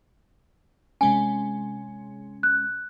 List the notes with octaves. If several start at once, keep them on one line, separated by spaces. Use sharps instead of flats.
C3 G#3 C#4 G#5
F#6